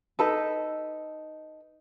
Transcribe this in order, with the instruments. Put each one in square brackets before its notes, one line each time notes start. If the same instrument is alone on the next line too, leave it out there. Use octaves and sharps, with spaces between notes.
[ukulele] D#4 A4 B4